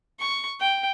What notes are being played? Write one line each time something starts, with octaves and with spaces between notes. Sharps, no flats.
C#6
G5